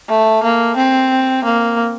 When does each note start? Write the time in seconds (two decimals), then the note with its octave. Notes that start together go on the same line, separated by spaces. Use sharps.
0.09 A3
0.43 A#3
0.76 C4
1.44 A#3